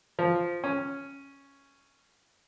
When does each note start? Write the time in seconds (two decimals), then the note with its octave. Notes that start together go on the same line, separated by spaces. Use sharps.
0.19 F3
0.64 C#4